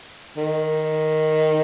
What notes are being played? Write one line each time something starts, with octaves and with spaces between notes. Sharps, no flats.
D#3